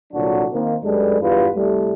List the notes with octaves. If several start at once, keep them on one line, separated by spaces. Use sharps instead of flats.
C2 A#2 D3 F#3 D4 F#4
D#3 A#3 C4
F#2 G3 G#3 D4 A4 B4
E2 G2 G3 B3 F4 B4
C2 G3 A3